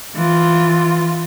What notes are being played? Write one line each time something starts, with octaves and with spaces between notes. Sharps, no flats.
E3 F4